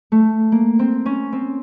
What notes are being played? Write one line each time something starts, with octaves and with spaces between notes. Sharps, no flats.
A3
A#3
C4
C#4
C4